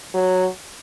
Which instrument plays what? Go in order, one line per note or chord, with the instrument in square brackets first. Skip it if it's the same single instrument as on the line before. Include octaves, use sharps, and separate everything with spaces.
[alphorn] F#3